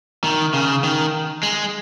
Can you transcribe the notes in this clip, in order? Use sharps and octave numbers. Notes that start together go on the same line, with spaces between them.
D#3
C#3
D#3
G#3